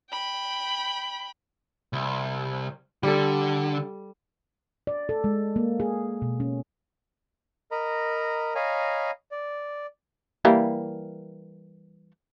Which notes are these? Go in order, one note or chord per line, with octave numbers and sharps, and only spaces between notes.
G5 B5
C2
D3 G3 A4
D5
A4
G#3
A#3
G#4
B2
C#4
A#4 D#5 A#5 B5
C#5 D#5 F5 G#5 A#5 B5
D5
E3 G3 A#3